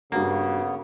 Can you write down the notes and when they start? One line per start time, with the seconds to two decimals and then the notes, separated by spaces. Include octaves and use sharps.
0.12 G2 C#3 A#3 B3 F#4